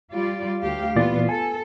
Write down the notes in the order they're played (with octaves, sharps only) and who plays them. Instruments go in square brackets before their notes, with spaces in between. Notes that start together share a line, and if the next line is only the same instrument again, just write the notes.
[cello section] G3 F4 D5
D2 G4 F5
[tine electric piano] A#2 E3 D5 [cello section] B3 F4
[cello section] A4 [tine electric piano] G#5